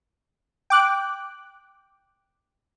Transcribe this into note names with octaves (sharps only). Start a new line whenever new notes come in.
G5 D6 F#6